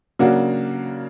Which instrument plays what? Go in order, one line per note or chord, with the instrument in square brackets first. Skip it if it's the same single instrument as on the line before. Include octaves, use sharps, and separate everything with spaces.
[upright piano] C#3 F#3 A#3 D4 F#4